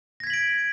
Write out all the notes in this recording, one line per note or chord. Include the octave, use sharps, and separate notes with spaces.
G#6 A#6 B6 D7 F#7